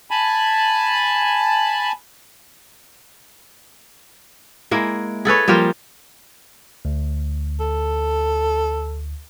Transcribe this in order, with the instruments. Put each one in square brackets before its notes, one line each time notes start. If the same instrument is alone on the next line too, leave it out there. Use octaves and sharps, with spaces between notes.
[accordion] G#5 A5 B5
[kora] G#3 A#3 E4
G#4 A4 B4 C#5
F3 G3 A#3 F4
[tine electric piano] D2
[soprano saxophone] A4